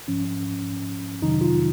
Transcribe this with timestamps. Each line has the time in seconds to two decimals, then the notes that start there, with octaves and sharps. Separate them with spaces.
0.08 G#2 F3 C#4
1.22 F2 C3 D#3 F#3 D#4
1.41 F4